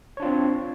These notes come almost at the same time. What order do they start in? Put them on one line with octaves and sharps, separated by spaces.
C#5 D4 F4 C4